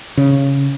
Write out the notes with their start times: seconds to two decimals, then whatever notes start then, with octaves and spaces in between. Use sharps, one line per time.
0.17 C#3